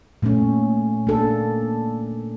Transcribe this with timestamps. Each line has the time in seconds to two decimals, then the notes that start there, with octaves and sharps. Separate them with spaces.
0.22 A#2 A3 C#4
1.07 A#3 D4 A4